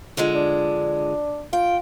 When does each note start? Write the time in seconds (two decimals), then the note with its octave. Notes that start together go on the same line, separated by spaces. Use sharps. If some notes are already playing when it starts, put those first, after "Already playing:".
0.17 D3 F3 G#3
0.35 D4
1.53 F4 G5